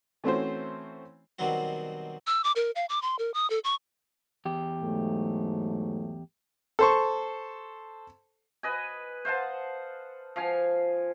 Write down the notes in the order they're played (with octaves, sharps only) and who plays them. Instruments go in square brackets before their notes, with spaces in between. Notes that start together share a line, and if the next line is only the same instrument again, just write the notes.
[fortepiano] E3 A3 C4 C#4 F#4 C5
[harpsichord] B2 D#3 F#3 G3 C4 F#4
[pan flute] E6
D6
A#4
F5
D6
C6
A#4
D#6
A4
C#6
[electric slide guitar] E2 G4
[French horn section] G#2 F#3 A3
[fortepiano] A4 C5 C#6
[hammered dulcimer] B4 D#5 G#5
C5 F5 F#5 A5
F3 F5 G#5